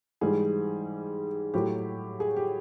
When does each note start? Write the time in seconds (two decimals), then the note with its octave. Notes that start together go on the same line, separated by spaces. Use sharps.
0.21 G#2 E3 G3 G#4
1.54 A2 F#3 G4
2.20 G#4
2.36 G4